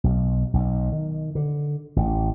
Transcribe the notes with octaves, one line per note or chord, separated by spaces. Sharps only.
B1
B1
D#3
D3
A1